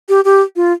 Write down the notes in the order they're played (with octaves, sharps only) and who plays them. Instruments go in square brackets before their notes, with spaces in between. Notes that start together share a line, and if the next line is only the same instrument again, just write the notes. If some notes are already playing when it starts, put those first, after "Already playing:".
[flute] G4
G4
F4